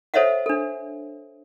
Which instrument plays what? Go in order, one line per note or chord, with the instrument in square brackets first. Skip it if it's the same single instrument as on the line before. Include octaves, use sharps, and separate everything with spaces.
[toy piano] A4 C5 C#5 D#5 E5 F#5
D4 A4